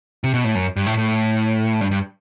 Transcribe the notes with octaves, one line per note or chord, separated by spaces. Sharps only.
C3
B2
A2
F#2
G2
A2
A2
G2
G2